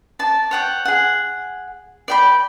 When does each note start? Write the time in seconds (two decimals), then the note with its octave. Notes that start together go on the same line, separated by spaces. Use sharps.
0.19 D5 A5
0.51 C#5 F#5 G5
0.85 G#4 F#5
2.08 D5 G5 B5